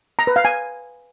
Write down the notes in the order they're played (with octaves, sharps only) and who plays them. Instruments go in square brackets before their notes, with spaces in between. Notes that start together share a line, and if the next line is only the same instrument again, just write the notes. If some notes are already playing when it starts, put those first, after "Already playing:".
[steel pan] A#5
B4
F5
G#5